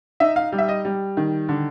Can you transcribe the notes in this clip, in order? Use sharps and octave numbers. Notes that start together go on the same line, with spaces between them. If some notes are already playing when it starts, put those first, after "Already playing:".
D#4 E5
F5
G3
E5
D#5
G3
D#3
D3